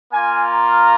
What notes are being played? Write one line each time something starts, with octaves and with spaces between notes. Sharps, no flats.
A#3 F4 G#5
A#5